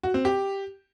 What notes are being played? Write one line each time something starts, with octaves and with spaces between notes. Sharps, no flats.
F#4
C4
G4